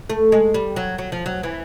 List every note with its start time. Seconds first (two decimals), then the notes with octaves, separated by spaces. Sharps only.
0.10 A3
0.32 G#3
0.54 G3
0.76 F#3
0.98 F#3
1.12 F3
1.26 F#3
1.43 E3